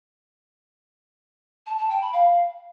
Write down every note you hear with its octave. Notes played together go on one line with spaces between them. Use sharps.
A5
A5
G5
B5
F5